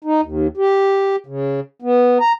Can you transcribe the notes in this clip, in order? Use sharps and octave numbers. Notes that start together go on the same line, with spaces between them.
D#4
D#2
G4
C#3
B3
A#5